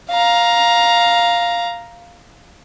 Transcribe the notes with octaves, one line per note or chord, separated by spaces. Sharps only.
F5 A#5